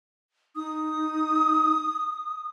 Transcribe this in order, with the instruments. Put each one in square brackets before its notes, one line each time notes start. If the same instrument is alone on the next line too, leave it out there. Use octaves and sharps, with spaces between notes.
[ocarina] D#4 [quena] D#6